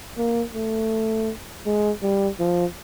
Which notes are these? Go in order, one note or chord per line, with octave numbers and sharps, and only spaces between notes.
A#3
A3
G#3
G3
F3